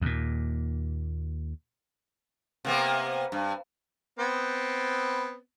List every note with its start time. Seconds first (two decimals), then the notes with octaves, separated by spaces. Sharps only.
0.02 D#2 A#2
2.65 C3 A#3 B3
3.32 G2
4.19 B3 C4